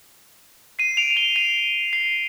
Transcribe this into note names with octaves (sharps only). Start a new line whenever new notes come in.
C7 D#7
D7 F7
F7
D#7 G7
C7 D#7
C7